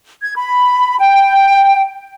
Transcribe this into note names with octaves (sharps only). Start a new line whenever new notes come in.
G#6
B5
G5